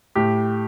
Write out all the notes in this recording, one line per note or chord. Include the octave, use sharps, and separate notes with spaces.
A2 G4